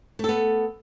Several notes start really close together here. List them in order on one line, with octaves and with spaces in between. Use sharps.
A3 A4 B3